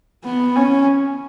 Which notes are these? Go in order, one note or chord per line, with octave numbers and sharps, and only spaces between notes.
B3
C#4